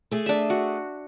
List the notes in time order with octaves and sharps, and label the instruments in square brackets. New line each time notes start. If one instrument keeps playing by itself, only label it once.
[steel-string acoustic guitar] A3 G#4
[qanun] D4 E5
F#4